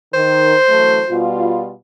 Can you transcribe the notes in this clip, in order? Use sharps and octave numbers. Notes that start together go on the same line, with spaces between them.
D#3 C5
F#2 E3 A3
B2 G3 F4